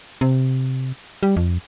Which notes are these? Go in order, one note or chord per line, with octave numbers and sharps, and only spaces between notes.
C3
G3
F2